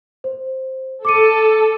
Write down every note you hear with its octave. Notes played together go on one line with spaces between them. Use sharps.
C5
A4 D6 C#7 D#7